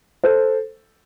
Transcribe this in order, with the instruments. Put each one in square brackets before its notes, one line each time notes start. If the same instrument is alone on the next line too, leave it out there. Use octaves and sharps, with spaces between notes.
[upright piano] A4 C5